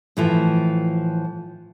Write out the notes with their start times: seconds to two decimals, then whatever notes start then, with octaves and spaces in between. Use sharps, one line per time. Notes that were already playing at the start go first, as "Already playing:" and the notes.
0.17 A2 E3 F3